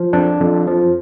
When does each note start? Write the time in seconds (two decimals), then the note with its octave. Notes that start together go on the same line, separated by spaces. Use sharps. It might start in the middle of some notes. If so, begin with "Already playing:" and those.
Already playing: F3
0.13 F2 D4
0.41 F2
0.67 F3